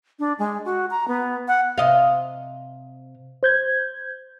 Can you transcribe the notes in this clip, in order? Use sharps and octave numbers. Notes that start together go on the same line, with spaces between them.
D4
G#3
F#4
A#5
B3
F#5
C3 D#5 F5
C5 G6 G#6